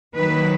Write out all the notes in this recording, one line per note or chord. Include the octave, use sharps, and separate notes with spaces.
D#3 F#3 A#3 B4